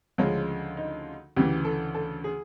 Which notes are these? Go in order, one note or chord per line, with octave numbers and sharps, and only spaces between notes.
D2 C#3 F3 G#3 C#4
D#4
D2 C#3 E3 G4
A4
A4
G#4